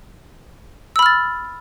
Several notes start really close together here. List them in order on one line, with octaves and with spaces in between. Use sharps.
E6 B5 F6 A6